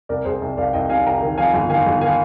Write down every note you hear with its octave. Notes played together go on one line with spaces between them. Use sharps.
C2 A#4 D5
C2 G#4 C5
C2
C2 D5 F5
C2 D#5 G5
C3 F5 G#5
C2 G5 A#5
D#3
F2 F5 G#5
G1
D#3 F5 G#5
G1
D#3 F5 G#5